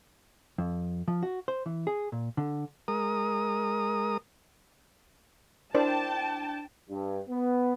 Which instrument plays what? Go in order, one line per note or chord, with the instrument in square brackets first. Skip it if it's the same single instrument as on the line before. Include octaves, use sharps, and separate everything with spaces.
[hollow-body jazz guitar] F2
F3
F#4
C5
E3
G#4
A#2
D3
[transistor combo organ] G#3 A#4 D#6
[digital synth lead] D4 [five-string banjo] E4 A#4 D5 [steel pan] C5 [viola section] G5 A5
[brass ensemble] G2
B3